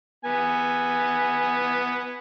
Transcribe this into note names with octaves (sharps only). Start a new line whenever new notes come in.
B3 G#5